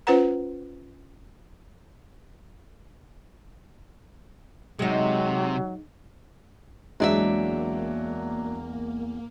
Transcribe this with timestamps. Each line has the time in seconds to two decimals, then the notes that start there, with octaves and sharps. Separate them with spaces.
0.07 C#4 F4 B4 C5 F#5 A#5
4.79 C3 F#3 G#3 D#4
7.00 E2 F#3 G#3 A#3 D4 D5 E5